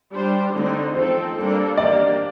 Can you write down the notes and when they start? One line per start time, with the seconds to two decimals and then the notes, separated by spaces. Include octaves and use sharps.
0.11 G3 D4 G4 C5
0.53 D3 A3 C4 D#4
0.94 F3 A3 C4 D#4 A4 C5
1.37 G3 A#3 D4 A4
1.77 A#3 D4 G4 D5